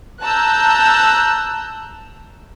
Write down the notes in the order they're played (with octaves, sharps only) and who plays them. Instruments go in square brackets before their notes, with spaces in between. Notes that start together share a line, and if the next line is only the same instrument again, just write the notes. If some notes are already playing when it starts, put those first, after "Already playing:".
[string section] A5 A#5 E6 F#6 G6